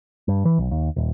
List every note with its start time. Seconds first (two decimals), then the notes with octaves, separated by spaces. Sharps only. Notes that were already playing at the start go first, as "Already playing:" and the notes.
0.28 G2
0.45 E3
0.58 B1
0.71 D#2
0.96 D#1